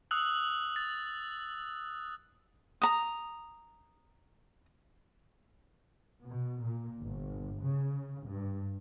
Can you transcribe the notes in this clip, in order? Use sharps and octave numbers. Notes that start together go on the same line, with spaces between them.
D#6 E6 F#6 F#7
A6
A#5 D#6
B2
A#2
G1
C#3
G2